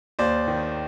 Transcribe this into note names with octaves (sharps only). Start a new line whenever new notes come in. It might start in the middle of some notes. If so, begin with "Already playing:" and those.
D#2 C5 D5
D#3